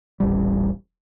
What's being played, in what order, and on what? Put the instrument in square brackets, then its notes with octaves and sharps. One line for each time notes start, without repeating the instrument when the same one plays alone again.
[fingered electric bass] D#1 A1 G3